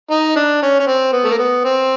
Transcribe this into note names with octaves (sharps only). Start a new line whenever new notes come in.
D#4
D4
C#4
C#4
C4
B3
A3
A#3
B3
C4